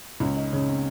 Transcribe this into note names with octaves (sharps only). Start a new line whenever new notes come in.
C#2 C#4
D#4
C#3 C#4
C4